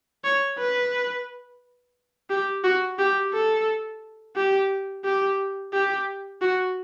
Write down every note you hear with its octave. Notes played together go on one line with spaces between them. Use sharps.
C#5
B4
G4
F#4
G4
A4
G4
G4
G4
F#4